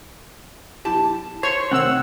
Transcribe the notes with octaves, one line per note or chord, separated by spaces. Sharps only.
B1 E4 G4 A5
C5 C#5 C#6
C3 D#3 A3 C4 F#5 E6